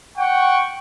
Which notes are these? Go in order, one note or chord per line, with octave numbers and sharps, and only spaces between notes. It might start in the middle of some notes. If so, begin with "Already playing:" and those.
F#5 G5 C#6